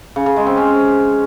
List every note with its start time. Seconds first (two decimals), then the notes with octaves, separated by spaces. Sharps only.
0.16 C#3
0.26 C#3
0.36 G#3
0.47 C4
0.57 C#4